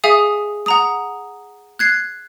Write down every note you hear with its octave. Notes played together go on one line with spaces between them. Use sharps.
G#4 E5 F5 G#5 D#6
F#5 A#5 D#6
F#6 G#6 C7